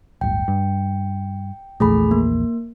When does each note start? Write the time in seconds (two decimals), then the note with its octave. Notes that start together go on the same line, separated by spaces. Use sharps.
0.21 D1 G1 G5
0.48 G2
1.80 A#1 E2 A3 G#4 B5
2.11 A#3